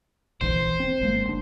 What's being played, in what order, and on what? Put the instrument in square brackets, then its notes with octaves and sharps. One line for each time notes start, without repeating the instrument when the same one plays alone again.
[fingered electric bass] D#1 A#1 E3 [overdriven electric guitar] C5
[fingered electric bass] C4
G1 G#3 A#3
G1 D4